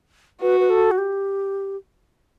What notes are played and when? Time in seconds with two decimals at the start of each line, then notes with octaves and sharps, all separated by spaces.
0.42 F#4 B4
0.60 B4
0.70 A4
0.91 F#4
0.98 G4